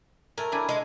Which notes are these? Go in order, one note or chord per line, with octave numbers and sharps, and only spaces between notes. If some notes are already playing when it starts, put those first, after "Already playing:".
A3 A#4 G#5
D4 E4 G#5
G#3